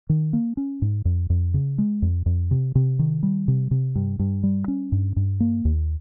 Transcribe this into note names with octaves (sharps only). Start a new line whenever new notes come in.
D#3
A#3
C#4
G#2
F2
F2
C#3
G#3
F2
F2
C3
C3
D#3
G3
C3
C3
G2
G2
G3
C#4
G2
G2
A#3
D#2